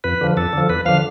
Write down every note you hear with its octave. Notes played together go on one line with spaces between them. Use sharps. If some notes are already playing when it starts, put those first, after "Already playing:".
F2 B4
D3 F3
F2 A4
D3 F3
E2 B4
D3 F3 F5